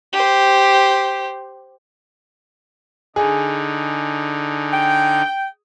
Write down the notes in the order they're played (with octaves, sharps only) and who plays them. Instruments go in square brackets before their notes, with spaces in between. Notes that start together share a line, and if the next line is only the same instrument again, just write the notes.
[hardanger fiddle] G4 C5
[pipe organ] D3 D#4 [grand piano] G#4
[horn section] G5